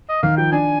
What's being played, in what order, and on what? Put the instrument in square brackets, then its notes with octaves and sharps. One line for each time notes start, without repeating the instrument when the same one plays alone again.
[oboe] D#5
[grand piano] D#3 [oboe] F5
[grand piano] F3 [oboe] G5
[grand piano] D4 [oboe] G#5